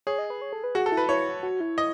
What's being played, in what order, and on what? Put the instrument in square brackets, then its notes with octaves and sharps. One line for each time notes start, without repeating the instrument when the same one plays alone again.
[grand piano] G#4 [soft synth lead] C#5
[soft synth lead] D#5
B4
C#5
A4
B4
[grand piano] F#4 [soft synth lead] G#4
[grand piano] A4
[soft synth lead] E4
[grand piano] B4
[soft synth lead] E4 [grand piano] C#5
[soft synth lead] F#4
E4
[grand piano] D#5